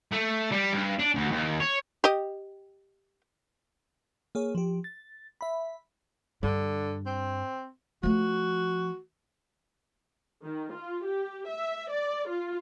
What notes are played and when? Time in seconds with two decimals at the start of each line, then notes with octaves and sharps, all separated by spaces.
0.12 A3
0.52 G3
0.73 G2
0.99 D4
1.15 D2
1.32 D#2
1.60 C#5
2.04 G4 D#5
4.35 A#3 G#4 C#5
4.55 F3 G4
4.84 A6
5.41 E5 B5
6.43 G2 D3
7.06 C4
8.03 F3 A3 F#4
10.44 D#3
10.73 F4
11.06 G4
11.48 E5
11.91 D5
12.29 F4